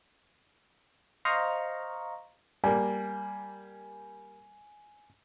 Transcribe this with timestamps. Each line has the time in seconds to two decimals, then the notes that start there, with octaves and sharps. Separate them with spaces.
1.25 C5 D#5 F5 A#5 C#6
2.64 G3 A#3 G#5